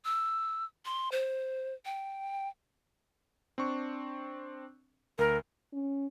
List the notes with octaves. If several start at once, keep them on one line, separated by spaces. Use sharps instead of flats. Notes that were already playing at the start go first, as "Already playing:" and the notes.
E6
C6
C5
G5
C4 D4 C#6
D2 A#4
C#4